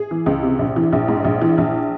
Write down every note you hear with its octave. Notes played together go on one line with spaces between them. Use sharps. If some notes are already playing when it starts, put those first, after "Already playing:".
Already playing: G#4
E3
C#2
C3
A#1
E3
A#1
G#2
A#1
E3
A#1